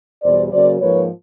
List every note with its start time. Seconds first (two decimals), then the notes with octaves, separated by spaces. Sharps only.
0.23 E2 B2 G3 C5 D5
0.52 C#3 F#3 A#3 C5 D5
0.80 G#2 F3 A#3 B4 C#5